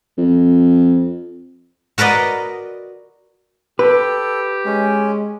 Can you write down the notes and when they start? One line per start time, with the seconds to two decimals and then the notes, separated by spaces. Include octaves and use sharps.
0.18 F2
1.98 F#4 A#4 B4 D5 D#5
3.79 G4 A4 B4
4.66 G#3 C#4